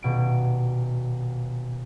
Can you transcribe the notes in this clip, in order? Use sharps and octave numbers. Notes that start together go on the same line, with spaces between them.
D#1 B2 D7